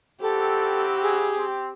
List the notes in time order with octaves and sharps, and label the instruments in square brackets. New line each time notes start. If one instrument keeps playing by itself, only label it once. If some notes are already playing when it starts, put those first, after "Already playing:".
[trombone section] C4 E4 F#4 [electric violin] G4 [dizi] A4
[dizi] G#4
[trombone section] C4